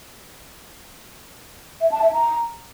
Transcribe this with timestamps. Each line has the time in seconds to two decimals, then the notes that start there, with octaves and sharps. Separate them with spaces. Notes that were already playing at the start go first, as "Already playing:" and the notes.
1.81 E5
1.92 A5
2.02 E5
2.13 A#5